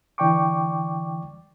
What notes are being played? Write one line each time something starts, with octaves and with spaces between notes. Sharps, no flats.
D3 E3 D5 G5 C#6 D6